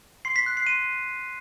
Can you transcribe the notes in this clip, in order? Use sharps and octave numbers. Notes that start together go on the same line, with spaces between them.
C6 C7
B6
F#6
C7
C6 D#7